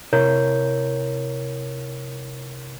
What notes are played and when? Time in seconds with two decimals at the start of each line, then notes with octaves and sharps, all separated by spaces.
0.13 C3 E4 A#4 C#5 G6